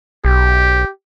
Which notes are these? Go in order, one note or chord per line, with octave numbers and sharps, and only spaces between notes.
B1 G4